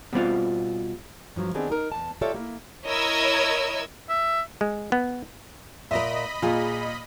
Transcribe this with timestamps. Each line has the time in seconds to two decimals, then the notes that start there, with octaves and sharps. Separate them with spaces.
0.13 B2 G3 C4 F4
1.36 G2 F3 F#3
1.54 D#3 B3 C4 D4 G4 G#4
1.70 D#4 A#4
1.92 E2 A5
2.21 F4 G4 A4 C#5 D5 E5
2.34 A#3 E4
2.85 E4 A#4 C#5 D#5 E6 G#6
4.09 E5
4.61 G#3
4.92 B3
5.91 A#2 A#4 D#5 E5 B5
6.42 A#2 F4 G#4